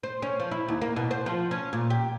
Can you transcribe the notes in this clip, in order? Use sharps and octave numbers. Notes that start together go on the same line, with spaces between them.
C5
C#4
F3
E4
D#2
A#3
B2
C5
F3
C#4
A#2
G4